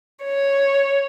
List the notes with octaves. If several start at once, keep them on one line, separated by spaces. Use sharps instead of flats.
C#5